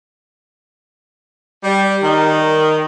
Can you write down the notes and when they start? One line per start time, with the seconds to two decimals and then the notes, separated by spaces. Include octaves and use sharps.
1.64 G3
2.03 D#3